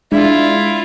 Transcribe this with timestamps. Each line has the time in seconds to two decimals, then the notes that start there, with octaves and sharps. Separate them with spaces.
0.12 G#3 D4 E4 F4